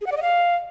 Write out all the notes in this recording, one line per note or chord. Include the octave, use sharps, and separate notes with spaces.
G#4
F#5
D5
D#5
F5